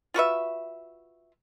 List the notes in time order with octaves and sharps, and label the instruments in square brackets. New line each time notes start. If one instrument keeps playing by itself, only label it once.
[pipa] F4 F#4 B4 E5